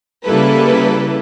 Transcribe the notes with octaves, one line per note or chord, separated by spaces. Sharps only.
C#3 G3 A#3 E4 A4 B4